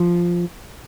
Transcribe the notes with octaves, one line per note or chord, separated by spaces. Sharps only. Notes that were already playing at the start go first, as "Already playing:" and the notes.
Already playing: F3